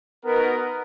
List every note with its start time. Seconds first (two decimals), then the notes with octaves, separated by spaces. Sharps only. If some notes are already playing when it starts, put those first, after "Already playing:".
0.24 B3 D#4 F#4 A#4